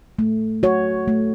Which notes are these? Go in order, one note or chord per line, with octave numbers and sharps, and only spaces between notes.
A3
F#4 C#5
A3